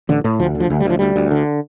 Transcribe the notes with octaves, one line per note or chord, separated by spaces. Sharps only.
A1 D3
A2
D2 F3
D3
F3
D2
G3
D2 F3
D2 G3
D2
D3